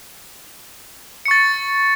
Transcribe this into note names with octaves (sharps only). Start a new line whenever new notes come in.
C#6 A6 C#7